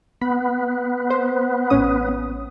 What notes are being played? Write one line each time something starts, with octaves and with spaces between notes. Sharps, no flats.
B3 B5
C5
A1 C#4 D#6